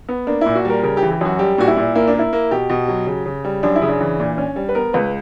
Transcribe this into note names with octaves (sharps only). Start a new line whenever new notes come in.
B3
A#3 D4
A#2 E4
F#4
G3 A#4
C#3 A#4
G4
E3
G4
F#2 F#4
G3 G4
A#2 F#4
E4
A#2
A#3 E4
D4
A#3 E4
A#3
B2 G4
B2
F#3
C#3
C#3
G3
F#2 D4
E4
C#3
D4
E3
A#2
C#4
G3
B4
B3 A#4
C#2 B4